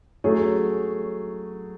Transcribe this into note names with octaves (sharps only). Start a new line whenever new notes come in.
F#3 A3 C#4 G#4